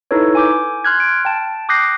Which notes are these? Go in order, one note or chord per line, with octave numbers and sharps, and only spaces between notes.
D#4 E4 A4 B4 C#5
G#5 D6 G6
C6 F6 F#6 G#6
D7
G5 A5
D6 D#6 F#6 G6 A#6 C7